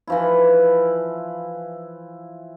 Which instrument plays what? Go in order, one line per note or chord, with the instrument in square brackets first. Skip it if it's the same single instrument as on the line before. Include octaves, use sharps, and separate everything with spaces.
[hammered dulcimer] E3 F3 E4